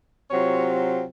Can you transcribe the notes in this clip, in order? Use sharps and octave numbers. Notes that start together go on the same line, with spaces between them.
C3 F#3 C4 F4 C#5